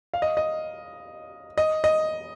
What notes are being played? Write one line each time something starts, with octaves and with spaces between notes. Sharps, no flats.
F5
D#5
D#5
D#5
D#5